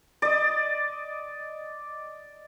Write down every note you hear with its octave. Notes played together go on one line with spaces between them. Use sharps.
D5 D#5